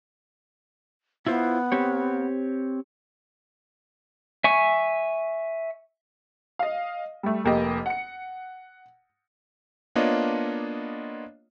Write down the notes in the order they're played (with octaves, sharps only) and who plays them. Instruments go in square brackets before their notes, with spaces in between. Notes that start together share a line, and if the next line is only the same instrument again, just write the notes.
[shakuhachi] B3 [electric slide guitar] E4 F4 C5
[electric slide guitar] C4 G4 C#5
[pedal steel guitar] E5 G#5 C#6
[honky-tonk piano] D#5 F5
G3 A3
F1 A#3 G4 D#5
F#5 C#7
[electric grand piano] A#3 B3 D4 F4 C#5 D#5